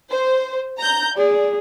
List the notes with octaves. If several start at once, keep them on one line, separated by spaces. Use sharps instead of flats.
C5
A#5 G6
G#4 D5